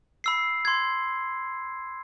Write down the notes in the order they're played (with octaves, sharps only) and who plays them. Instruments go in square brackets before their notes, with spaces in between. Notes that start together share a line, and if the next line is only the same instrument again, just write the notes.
[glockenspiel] B5 E6 C7
C6 G#6